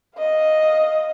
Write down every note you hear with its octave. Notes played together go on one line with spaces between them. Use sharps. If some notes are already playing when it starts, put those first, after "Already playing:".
D#5 F5